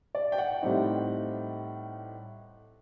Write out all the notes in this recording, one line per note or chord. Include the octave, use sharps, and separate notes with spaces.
D5
G5
F#5
A2 G3 C4 D#4